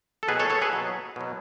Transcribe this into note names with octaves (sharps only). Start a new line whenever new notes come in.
A4
B2 F#3 G#4 B4
A4 C#5
A4 C#5
G#4 B4
B2 F#3
B2 F#3